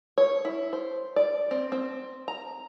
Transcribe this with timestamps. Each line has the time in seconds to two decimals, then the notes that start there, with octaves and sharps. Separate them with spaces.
0.18 C#5
0.45 E4
0.73 C5
1.16 D5
1.51 C4
1.72 C4
2.28 A#5